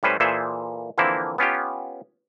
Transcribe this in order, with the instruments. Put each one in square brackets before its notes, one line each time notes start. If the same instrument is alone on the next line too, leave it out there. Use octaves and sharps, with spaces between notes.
[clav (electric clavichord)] A2 G3 C#4 B4 C5
A#2 E3 G#4 A4 C5 E5
D3 E3 F3 A#3 C4 E4
B3 C#4 F4 G4